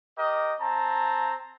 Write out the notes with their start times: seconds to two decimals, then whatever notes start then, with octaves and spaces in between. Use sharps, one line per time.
0.18 G4 A#4 D#5
0.61 C4 A5 A#5